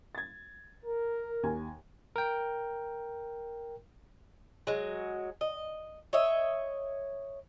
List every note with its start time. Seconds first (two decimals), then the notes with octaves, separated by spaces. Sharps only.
0.15 G#6 A6
0.85 A#4
1.43 D#2 G#5
2.16 A#4 G5
4.67 F#3 G#3
5.41 D#5
6.13 C#5 D#5 E5